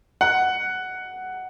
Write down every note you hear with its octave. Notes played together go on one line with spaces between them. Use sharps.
F#5